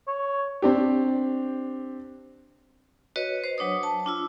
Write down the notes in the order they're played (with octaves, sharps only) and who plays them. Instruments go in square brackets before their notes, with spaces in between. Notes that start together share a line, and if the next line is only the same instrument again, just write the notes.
[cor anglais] C#5
[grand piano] C4 D4 G4
[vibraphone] F#4 B4 C#5 D#5
C5
F#3 D4 C#5 D#6
A5
D4 F4 E6